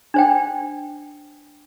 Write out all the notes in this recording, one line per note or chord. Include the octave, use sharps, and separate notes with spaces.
D4 C5 G5